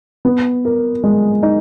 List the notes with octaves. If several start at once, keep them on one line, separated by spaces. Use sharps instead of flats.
B3
A#4
G#3
D#4